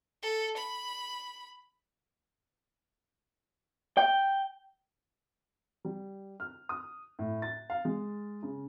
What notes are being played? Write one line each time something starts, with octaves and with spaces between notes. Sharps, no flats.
A4
B5
G5
G3
F6
D#6
A2
A6
F5
G#3
C#3